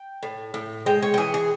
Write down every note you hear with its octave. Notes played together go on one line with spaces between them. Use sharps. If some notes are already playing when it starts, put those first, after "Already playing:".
Already playing: G5
A2
A2
G#3 G5
C#5
G4
E3 G#4
G#4